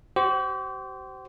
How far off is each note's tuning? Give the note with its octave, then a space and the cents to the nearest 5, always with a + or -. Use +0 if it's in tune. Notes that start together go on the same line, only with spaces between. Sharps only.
G4 -45 C5 -10